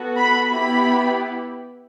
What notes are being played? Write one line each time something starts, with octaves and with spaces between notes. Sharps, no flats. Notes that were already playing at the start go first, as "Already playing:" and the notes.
Already playing: B3 F#4 A4
B5
B3 E4 G4 B5